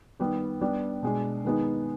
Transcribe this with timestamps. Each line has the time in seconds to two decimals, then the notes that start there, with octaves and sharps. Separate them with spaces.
0.19 D#3 G3 B3
0.61 G3 B3 D4
1.03 B2 G#3 D4
1.45 D#3 G#3 B3 D#4